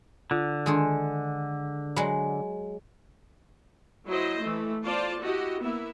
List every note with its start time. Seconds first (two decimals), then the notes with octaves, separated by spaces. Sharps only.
0.31 D3 F4
0.66 D#3 G#3 D4 G#4 A4 C6
1.96 F#3 G#3 D5 G#5 B5
4.08 F#3 E4 C5 D#5
4.42 E3 A3
4.85 B3 F4 C5 D5 A5
5.20 E4 F#4 G4 D#5
5.61 A#3 B3 E4 E5